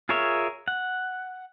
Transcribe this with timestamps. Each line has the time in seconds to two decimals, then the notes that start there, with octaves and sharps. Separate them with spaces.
0.09 F4 G#4 A#4 C#5 E5
0.68 F#5